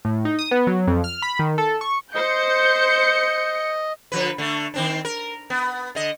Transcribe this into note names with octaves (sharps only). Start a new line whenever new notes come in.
A2
D#4
D#6
B3
F#3
F2
F6
B5
D#3
A4
C#6
C5 D#5 G6 C#7
D3 F3 B4
D3 A3
D#3 C4 D4
A#4
B3
D3 D#5